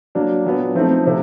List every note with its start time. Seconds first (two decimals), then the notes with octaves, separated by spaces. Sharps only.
0.15 F#3 A#3 D4
0.45 A#2 F#3 B3 D4
0.74 F3 A3 C4 D#4
1.04 C3 F3 A3